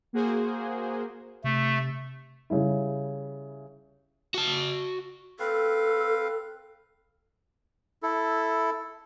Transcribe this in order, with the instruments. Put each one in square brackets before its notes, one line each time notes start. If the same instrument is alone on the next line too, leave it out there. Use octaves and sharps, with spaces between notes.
[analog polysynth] A#3 F#4 G#4 C5
[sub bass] C3 [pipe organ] A3
[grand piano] C#3 G3 E4
[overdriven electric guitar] F#4 A5
[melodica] C4 B4 F5 [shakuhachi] A4
[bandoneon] E4 A4